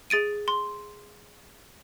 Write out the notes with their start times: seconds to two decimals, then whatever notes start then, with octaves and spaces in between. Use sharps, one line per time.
0.10 G#4 A6 D7 D#7
0.48 C6